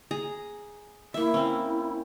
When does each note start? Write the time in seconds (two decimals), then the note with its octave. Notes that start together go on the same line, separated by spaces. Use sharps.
0.11 G#4 A#5
1.14 A#3 E4 E5
1.34 C4 C#4